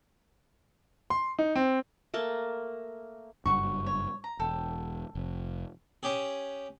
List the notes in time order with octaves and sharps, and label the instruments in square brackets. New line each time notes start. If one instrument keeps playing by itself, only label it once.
[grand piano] C6
D#4
C4
[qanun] A3 A#3 A5
[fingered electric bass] F#1 G2 [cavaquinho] F#4 C#6
[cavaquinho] C#5
A#5
[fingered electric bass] E1 [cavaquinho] A4 G5
[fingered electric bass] F1
[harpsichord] C#4 G4 G#4